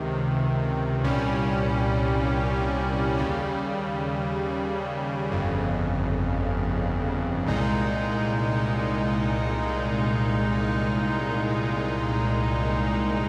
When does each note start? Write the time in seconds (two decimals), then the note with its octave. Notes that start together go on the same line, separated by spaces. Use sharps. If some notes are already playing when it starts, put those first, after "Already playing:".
Already playing: C#2 C3 D#3
1.03 C2 A#2 G3 C#4
3.17 D#2 C#3 G3
5.31 G1 F2 C#3
7.46 C2 A#2 G#3 D#4